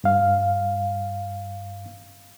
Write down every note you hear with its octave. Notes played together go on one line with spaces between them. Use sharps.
G2 F5